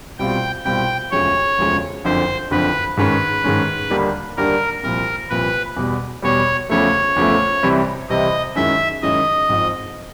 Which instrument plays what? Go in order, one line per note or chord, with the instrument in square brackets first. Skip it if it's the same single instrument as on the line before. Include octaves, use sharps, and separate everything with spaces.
[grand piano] C2 B2 G3 C4 F4 [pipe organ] G5
[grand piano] C2 B2 G3 C4 F4 [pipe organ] G5
[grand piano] E1 D2 C#3 F3 G#3 [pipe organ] C#5
[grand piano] E1 D2 C#3 F3 G#3
[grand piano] F#1 F2 D3 F3 [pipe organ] C5
[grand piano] F#1 F2 D3 F3 [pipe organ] B4
[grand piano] G#2 D#3 G#3 C#4 [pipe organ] B4
[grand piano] G#2 D#3 G#3 C#4
D#2 D3 G3 A#3 D4
[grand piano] D#2 D3 G3 A#3 D4 [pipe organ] A#4
[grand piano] C2 A#2 F3 [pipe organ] A#4
[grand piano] C2 A#2 F3 [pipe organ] B4
[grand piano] E2 B2 G3
[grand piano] E2 B2 G3 [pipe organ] C#5
[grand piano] E2 C#3 F3 A3 [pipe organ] C#5
[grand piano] E2 C#3 F3 A3
C2 C3 E3 G3 C4
[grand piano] C2 C3 E3 G3 C4 [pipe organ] D#5
[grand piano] F#2 D#3 G#3 C#4 E4 [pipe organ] E5
[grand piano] F#2 D#3 G#3 C#4 E4 [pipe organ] D#5
[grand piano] G#1 G#2 F3